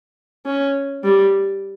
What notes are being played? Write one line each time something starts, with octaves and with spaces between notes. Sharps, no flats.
C#4
G3